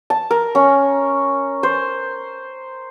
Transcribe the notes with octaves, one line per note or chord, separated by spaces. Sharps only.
A5
A#4
C#4
C5